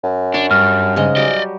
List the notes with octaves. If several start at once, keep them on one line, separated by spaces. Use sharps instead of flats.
F#2
D4 C#5
G2 F6
G#2 C#3 G#3 D#5
F#3 G3 G4 D5 D#5